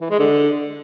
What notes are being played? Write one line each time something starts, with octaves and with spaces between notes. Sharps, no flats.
E3
G#3
D3